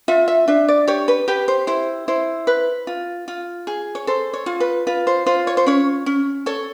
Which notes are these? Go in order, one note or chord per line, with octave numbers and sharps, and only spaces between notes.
F4 E5
E5
D4 E5
D5
G4 C#5
B4
G4 B4
C5
E4 C5
E4 C5
B4
F4
F4
G#4
C#5
A4 C5
C#5
F4
B4
F4 B4
C5
F4 C5
C#5
C5
C#4 C#5
C#4
A4 C#5